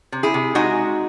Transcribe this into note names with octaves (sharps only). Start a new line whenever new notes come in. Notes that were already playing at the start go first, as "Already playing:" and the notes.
C3
E4 G#4
C3
G#3 D#4 F#4